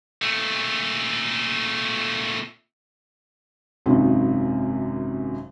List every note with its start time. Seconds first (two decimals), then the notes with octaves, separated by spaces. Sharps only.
0.22 A#2 A3
3.86 G#1 F#2 C3 D#3